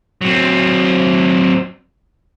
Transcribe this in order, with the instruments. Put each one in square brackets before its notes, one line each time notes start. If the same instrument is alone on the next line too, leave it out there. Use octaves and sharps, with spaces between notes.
[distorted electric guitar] F#3 C4